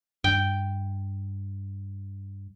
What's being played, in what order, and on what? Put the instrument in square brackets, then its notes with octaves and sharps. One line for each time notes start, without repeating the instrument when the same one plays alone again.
[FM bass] G2 [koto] G5